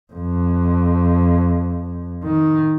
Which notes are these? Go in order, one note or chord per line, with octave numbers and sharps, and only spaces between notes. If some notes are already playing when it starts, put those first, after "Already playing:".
F2
D#3